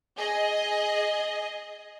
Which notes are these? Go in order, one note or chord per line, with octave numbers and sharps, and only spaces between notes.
G#4 D#5